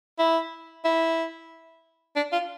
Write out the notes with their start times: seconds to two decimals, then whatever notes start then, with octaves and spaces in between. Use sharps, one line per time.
0.19 E4
0.85 E4
2.16 D4
2.33 F4